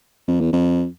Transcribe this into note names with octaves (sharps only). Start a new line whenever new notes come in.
F2
E2
F2